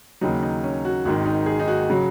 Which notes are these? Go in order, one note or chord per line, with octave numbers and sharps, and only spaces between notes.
D#2 C#3 F#3 D#4
D#4
C#4
F#4
G#1 G#2 D#3 F#4
D#4
G#4
D#4
F#4
C#3 F#3